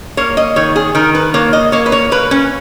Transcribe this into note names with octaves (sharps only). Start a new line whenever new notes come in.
A#3 C#5
D#5
D#3 C#5
G#4
D#3 A#4
B4
A#3 C#5
D#5
A#3 C#5
B4
C#5
A#3 B4
C#4